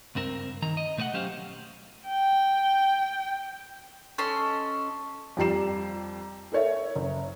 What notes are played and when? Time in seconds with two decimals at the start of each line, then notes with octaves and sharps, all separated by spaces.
0.15 C#2 G2 C4 A#4
0.62 D#3 A#5
0.77 D#5
0.97 B2 A3 B4 D#5 F#5
1.14 F#3 C#4 G4 C5 F5
2.09 G5
4.18 C#4 A4 D#5 C6
5.37 F2 G3 G4 A#5 C7 E7
6.52 A4 A#4 C#5 E5
6.95 F#1